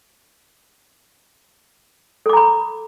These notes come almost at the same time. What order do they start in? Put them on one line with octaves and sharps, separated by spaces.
A4 D6 A#5 B5